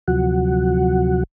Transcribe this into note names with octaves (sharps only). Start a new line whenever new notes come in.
D2 C3 F3 F#3 F#4 F#5